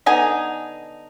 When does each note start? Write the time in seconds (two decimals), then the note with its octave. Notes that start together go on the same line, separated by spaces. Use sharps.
0.06 D3 B3 D#4 G#5